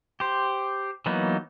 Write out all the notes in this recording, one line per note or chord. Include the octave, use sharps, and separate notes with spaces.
G4 C5
E3 F#3 A#3 B3 D#4